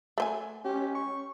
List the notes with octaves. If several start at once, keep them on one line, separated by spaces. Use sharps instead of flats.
A3 C5 G#5
C#4 G4
C#6